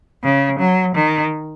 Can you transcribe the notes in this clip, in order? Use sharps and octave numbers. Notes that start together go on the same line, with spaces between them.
C#3
F#3
D#3